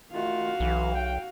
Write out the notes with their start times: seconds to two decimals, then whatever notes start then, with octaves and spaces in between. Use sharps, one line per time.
0.13 D#3 A3 F4 F#4 F5
0.60 B1 E3
0.94 G5